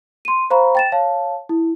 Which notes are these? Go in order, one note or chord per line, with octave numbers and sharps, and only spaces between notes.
C6 D#7
C5 F5 A#5 B5 C#6
G5 A6 E7
C#5 F5 A5
E4